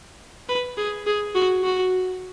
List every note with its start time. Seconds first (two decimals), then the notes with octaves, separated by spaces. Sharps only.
0.49 B4
0.77 G#4
1.07 G#4
1.35 F#4
1.64 F#4